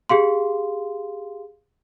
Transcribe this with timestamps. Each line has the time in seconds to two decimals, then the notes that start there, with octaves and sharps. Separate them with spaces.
0.09 G4 G#4 F5 C6